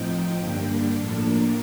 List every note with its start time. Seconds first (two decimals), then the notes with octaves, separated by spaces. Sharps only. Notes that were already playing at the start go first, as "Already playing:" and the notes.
Already playing: A2 F3 C4 D#4 G5
0.39 G2 D3 G3 A#3 D4
0.95 A2 F3 A#3 D4 A4
1.24 A#4